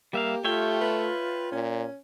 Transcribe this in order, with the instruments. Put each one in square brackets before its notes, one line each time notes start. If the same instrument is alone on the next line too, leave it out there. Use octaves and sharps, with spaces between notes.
[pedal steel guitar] G3 E5 F5 [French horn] A#3 [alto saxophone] G4
[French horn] A3 [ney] F4 [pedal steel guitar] C#5 E5 G5
[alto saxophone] B4
[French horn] A#2 [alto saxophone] C#4